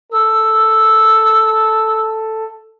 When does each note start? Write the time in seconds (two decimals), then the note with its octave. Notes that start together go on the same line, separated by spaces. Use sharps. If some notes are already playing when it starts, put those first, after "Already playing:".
0.12 A4 E6